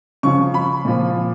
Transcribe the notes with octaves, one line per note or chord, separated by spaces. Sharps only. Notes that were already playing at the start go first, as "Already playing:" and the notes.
C#3 F3 C#6
B5
A#2 F3